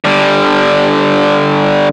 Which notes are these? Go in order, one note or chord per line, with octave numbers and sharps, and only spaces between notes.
D3 G3